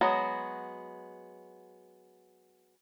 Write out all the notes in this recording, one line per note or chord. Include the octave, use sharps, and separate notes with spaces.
F#3 G#3 B3 F#4